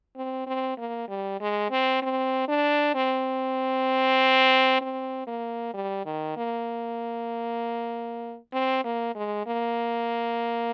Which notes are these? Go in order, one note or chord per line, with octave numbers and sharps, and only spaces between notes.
C4
C4
A#3
G3
G#3
C4
C4
D4
C4
C4
A#3
G3
D#3
A#3
C4
A#3
G#3
A#3